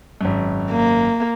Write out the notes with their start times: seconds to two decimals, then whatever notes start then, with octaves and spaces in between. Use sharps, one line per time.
0.21 G#1 F#2
0.71 A#3